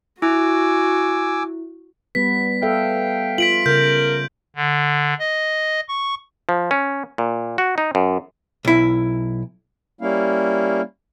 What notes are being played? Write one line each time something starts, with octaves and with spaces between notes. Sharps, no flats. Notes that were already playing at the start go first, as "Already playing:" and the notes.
E4 F#4 G#5 D6 E6
G3 B3 B4 B6
A4 E5 F5 G5
F4 B6 D7 F#7
C#3 A#4 G6
D3
D#5
C#6
F3
C#4
A#2
F#4
D#4
F#2
B1 E4
G3 A#3 C#4 E4 F5